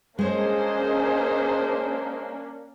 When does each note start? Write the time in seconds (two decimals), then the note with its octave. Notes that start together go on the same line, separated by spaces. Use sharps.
0.19 G#3 A#3 C#4 D4 G#4 C5 C#5 D#5